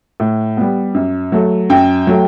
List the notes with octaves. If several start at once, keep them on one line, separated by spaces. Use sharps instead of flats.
A2
G3 B3
F#2
F#3 A3
F#2 G5
F#3 A3